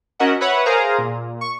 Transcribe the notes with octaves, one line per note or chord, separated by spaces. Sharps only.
C#4 F#4 A#4 D#5 E5 F#5
B4 C#5 E5 F#5 B5
G#4 A#4 C5 F5 A#5 D#6
A#2
C#6